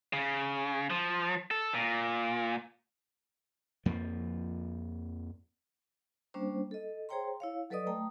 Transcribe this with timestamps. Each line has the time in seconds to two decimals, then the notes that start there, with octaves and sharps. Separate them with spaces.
0.13 C#3
0.90 F3
1.51 A4
1.74 A#2
3.86 F2 F3 A#3
6.34 G3 A#3 C#4 D4 C5
6.71 A4 D#5
7.09 G#4 C5 C#5 G5 A#5 C6
7.40 E4 C#5 F5
7.70 F#3 A4 B4 D5 D#5 D#6
7.87 A3 G5 A#5 D#6